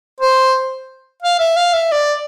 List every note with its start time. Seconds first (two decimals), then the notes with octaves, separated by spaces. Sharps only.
0.20 C5
1.23 F5
1.39 E5
1.56 F5
1.74 E5
1.92 D5